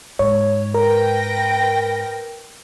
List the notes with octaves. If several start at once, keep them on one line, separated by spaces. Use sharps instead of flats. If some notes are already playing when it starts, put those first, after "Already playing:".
G#2 C#5
A#4 B4 G5 A#6